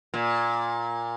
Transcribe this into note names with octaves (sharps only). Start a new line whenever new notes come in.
A#2